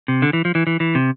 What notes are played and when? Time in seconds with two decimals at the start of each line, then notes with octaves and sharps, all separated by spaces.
0.08 C3
0.22 D3
0.33 E3
0.45 F3
0.55 E3
0.67 E3
0.80 E3
0.95 C3